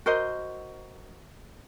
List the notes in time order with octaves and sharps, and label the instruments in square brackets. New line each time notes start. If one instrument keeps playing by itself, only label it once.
[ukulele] F#4 A#4 C5 D#5